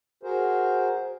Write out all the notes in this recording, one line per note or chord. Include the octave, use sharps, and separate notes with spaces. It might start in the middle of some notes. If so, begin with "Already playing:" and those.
F#4 G#4 A#4 C5